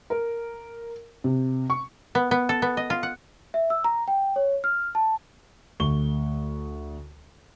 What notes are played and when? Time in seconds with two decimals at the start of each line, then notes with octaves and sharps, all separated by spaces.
0.10 A#4
1.24 C3
1.70 C#6
2.15 B3
2.31 B3
2.49 A4
2.62 B3
2.77 D#5
2.90 F4
3.03 F#5
3.54 E5
3.70 E6
3.84 A#5
4.08 G5
4.36 C#5
4.64 F6
4.95 A5
5.80 D2 C#6 G7